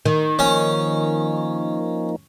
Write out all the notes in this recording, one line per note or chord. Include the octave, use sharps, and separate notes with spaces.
D#3
F3 A#3 C#4 D#4